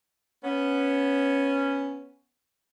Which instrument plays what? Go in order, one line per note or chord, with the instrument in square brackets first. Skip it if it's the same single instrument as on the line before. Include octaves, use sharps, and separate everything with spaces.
[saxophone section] B3 C#4